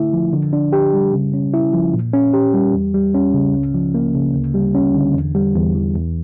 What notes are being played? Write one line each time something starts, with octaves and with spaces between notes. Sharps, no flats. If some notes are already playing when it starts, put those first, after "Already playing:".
Already playing: D3 A3 E4
F3
D3
D4
G4
G3
C#3
C#4
E4
F3
A#2
C#4
G4
G3
E2
G3
C#4
C#3
C#2
F3
A#3
C#3
D2
G3
C#4
D3
E2
G3
E2
E3
E2